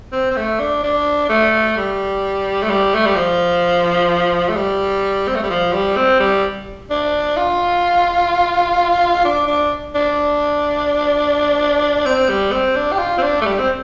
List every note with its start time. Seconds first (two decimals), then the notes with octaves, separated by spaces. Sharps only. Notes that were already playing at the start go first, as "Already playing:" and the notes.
0.13 C4
0.31 C4
0.36 A3
0.60 D4
0.83 D4
1.29 A3
1.77 G3
2.63 A3
2.70 G3
2.95 A3
3.06 G3
3.16 F3
4.49 A3
4.56 G3
5.28 C4
5.35 A3
5.43 G3
5.50 F3
5.73 G3
5.97 C4
6.20 G3
6.90 D4
7.37 F4
9.25 D4
9.47 D4
9.95 D4
12.05 C4
12.29 G3
12.52 C4
12.76 D4
12.92 G4
12.99 F4
13.18 C4
13.22 D4
13.41 A3
13.46 G3
13.59 C4